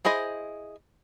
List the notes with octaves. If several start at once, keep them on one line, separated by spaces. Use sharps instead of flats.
E4 G#4 C5 D#5